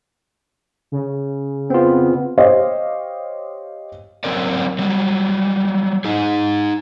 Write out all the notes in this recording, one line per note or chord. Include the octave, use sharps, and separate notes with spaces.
C#3
B3 C4 F4
G4 C5 C#5 D#5 F5
F#3 C4 C#4 A#4 D5
F#3 G3
D#4 G#4